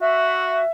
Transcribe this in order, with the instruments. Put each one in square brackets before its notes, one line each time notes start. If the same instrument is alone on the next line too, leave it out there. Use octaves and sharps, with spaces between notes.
[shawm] F#4 [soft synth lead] E5